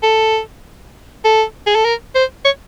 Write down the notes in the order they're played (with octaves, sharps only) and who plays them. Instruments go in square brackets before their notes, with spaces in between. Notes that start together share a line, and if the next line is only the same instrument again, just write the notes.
[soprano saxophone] A4
A4
G#4
A4
A#4
C5
C#5